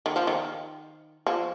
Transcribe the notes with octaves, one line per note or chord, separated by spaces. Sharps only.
D#3
F3
D#3
F3